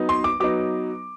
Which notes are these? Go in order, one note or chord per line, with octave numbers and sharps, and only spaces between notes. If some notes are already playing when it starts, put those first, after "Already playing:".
Already playing: F#3 B3 D#4
C6
D6
F#3 B3 D#4 D6